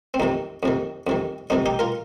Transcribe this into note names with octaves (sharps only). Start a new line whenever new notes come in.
C4
F2 C3 D#3 D#4
F2 C3 D#3
F2 C3 D#3
F2 C3 D#3 D#4
D#4 G4
F4 A#4